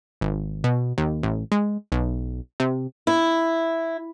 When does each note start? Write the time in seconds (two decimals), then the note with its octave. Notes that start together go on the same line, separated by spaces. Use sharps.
0.21 G#1
0.64 B2
0.98 D#2
1.23 A1
1.52 G#3
1.92 B1
2.60 C3
3.07 E4